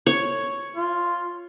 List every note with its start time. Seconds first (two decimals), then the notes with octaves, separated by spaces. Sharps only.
0.07 C#5
0.76 F4